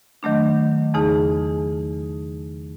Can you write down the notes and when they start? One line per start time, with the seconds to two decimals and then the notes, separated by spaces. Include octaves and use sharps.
0.23 D#3 F#3 A3 D4
0.94 E2 C#3 D#4 G#4 A5